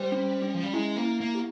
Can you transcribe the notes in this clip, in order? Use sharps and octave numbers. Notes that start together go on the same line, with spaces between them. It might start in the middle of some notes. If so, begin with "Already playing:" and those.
Already playing: G3 C5
C#4
C#4
F3
G3
G#3 E4
A#3
E4
A#3
G4